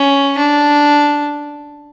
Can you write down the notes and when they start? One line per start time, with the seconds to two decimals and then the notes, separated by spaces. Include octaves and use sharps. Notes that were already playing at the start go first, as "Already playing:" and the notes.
Already playing: C#4
0.38 D4